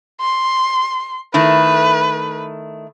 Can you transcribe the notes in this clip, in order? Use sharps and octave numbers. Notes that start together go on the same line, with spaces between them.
C6
D#3 A3 E4 B4